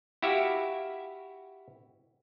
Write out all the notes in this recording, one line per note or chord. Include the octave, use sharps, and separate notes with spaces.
E4 F#4 G4 E5 F5